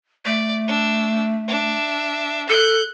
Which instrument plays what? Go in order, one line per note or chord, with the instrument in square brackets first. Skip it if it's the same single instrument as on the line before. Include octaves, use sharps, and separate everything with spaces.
[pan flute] A3 [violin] D5
[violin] D4 E6
D4 E5
[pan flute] A4 [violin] F#6 G6